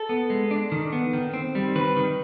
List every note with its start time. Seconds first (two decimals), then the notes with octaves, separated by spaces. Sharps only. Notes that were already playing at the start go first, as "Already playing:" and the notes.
Already playing: A4
0.09 B3
0.30 G#3
0.51 D4
0.72 D#3
0.93 B3
1.13 D#3
1.34 C4
1.55 G3
1.75 D#3 B4
1.97 D#3